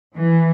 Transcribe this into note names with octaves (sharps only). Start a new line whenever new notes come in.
E3